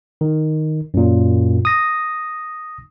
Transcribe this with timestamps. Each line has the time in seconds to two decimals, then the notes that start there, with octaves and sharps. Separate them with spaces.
0.21 D#3
0.94 F#2 A#2
1.65 D#6 A#6